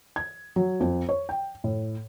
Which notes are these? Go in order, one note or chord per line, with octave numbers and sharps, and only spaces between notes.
G#6
F#3
F2
C#5
G5
A2